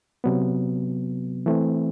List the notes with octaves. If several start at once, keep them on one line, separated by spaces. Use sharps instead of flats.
C3 F#3 B3
E3 A3 C4